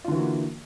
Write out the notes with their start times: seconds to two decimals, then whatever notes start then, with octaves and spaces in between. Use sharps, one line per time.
0.04 F4
0.08 D3
0.11 E3
0.15 F#4
0.19 A#3